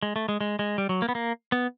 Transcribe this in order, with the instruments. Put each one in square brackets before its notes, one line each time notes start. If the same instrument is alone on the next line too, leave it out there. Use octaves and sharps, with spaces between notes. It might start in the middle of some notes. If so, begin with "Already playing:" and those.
[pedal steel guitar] G#3
A3
G#3
G#3
G#3
G3
F#3
A#3
B3
A#3
B3